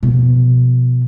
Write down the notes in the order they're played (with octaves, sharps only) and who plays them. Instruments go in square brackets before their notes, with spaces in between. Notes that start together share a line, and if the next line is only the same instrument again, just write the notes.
[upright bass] B2 F3